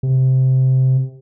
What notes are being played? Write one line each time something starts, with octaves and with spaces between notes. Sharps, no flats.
C3